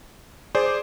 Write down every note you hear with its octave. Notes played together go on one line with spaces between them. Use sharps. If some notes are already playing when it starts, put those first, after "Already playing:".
G#4 C5 D5 D6